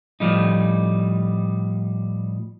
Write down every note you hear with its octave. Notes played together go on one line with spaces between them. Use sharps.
A2 F3 G3 D#4